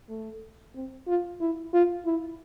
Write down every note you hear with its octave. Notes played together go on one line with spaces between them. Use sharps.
A3
C4
F4
E4
F4
E4